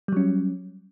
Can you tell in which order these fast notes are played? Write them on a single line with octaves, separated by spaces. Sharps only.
G3 F#3 C#4